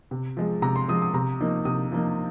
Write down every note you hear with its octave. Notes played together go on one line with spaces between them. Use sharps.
C3
F3 G#3
C3 A#5
C6
F3 G#3 D#6
D#6
C3 A#5
F3 A#3 D#4
C3 D#6
F3 A#3 D#4